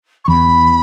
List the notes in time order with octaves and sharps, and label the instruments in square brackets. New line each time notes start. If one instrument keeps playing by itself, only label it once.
[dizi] C#6
[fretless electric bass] E2 [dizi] B5